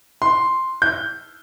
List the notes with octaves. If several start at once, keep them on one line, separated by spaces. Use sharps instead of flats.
C6
G6